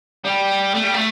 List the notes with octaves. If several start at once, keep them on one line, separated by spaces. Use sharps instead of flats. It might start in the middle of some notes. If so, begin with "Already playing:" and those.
G3
A3
G3
A3